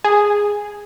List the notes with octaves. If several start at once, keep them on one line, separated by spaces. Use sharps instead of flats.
G#4